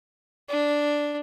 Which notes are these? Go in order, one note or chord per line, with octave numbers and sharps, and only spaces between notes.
D4